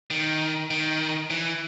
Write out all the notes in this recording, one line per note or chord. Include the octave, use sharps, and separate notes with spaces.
D#3
D#3
E3